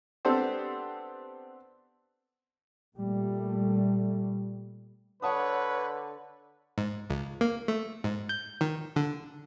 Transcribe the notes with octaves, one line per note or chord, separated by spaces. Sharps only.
B3 C4 D4 G4 A4 C5
A#2 G3 A3
D3 B4 C#5 F#5 A5 D#6
G#2
C#2
A#3
A3
G#2
G6
D#3
D3